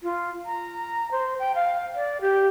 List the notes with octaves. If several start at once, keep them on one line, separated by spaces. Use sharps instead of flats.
F4
A#5
C5
G5
F5
D5
G4